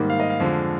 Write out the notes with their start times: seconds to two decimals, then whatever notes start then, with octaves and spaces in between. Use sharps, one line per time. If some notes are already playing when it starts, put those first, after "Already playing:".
Already playing: G#2 D#3 G3 A#3
0.10 F5
0.20 D#5
0.30 F5
0.40 F2 D3 F3 G#3